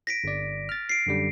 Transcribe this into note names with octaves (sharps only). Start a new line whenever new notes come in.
A#6 B6 D7
G1 D5
F6 A6
C7 D7
F#2 D3 G3